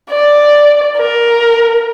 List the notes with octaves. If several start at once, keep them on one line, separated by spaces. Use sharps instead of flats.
D5
A#4